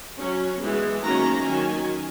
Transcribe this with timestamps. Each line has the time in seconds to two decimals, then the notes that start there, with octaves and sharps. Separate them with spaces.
0.18 F#3 C#4
0.61 E3 G#3 B3
1.04 D#3 F#3 A#3 C#4 A#5
1.47 D#3 F#3 C#4 G#5